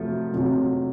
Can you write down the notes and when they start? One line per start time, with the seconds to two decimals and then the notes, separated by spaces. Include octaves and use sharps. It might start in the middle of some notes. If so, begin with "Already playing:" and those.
Already playing: F2 C3 F3 F#3 A3
0.33 F2 C3 F#3